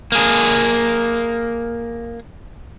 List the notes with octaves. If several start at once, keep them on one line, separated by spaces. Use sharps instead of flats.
A#3 G#4